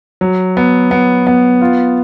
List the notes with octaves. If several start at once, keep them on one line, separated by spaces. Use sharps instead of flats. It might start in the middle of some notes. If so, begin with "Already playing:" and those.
F#3
B3
B3
B3
F4